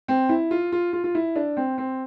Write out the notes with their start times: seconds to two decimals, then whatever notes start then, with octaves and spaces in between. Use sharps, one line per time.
0.08 C4
0.29 E4
0.51 F4
0.72 F4
0.93 F4
1.04 F4
1.15 E4
1.36 D4
1.57 C4
1.78 C4